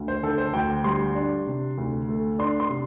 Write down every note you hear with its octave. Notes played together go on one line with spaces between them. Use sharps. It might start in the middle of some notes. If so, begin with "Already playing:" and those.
Already playing: D2
C5
D3 A4
C5
D2 G5
G3 C6
D4
C3
D2
A3
D4 C6
C6
C3